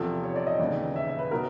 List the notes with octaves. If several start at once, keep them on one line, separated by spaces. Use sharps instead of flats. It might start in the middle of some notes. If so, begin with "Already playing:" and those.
Already playing: E2 C3 F3 A4
C#5
D5
D#5
D#2 C#3 E3
E5
E5
B4
B2 F#3 A#4